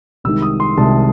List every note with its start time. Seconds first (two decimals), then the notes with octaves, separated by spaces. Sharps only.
0.24 C2 C3 D#3 G#3 E6
0.42 D#6
0.60 C6
0.77 C2 C3 D#3 G#3 A5